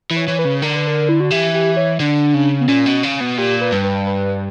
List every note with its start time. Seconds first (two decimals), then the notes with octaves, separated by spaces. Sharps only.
0.10 E3 B4
0.17 C#5
0.28 E3 C#5
0.39 B4
0.45 C#3
0.62 D3 A#4
0.76 B4
0.87 A#4
1.09 E4
1.20 F#4
1.31 E3 G4
1.54 G4
1.76 C#5
2.00 D3 D4
2.34 C#3
2.61 B3
2.68 A#2 C#4
2.86 B2
3.03 C#3
3.20 B2
3.37 A#2 G4
3.61 B4
3.72 G2
3.84 B4
4.07 B4